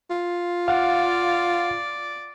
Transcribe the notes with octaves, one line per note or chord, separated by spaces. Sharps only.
F4
D5 F5 F#5